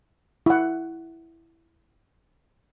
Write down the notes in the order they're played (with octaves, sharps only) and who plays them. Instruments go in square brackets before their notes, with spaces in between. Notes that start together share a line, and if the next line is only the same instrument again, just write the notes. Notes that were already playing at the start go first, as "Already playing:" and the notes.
[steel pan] E4 F#5